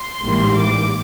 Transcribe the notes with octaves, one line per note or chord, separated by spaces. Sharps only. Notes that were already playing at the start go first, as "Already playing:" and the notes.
Already playing: C6
A1 G#2 E3 G3 A#3
D6